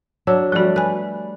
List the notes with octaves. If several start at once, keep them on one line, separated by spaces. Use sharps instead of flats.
F#3 D4 E6
F3 G3 A3 F#4
B4 G#5 F#6